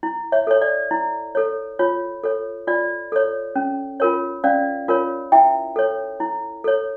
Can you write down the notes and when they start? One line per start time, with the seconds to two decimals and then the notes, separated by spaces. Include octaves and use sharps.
0.03 E4
0.32 C#5 E5
0.47 A4 C#5
0.62 D5
0.91 E4
1.35 A4 C#5
1.79 F4 C#5
2.24 A4 C#5
2.67 F4 D5
3.12 A4 C#5
3.55 C#4
4.00 F4 A#4 C#5
4.44 C#4 D5 F5
4.88 F4 A#4 C#5
5.32 E4 E5 G5
5.76 A4 C#5
6.20 E4
6.64 A4 C#5